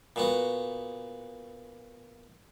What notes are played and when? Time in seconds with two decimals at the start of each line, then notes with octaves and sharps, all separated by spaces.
0.16 A#2 B3 F#4